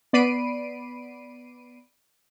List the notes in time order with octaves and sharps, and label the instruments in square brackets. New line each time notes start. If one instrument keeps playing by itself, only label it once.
[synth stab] B3 D5 B5 C7 D7 D#7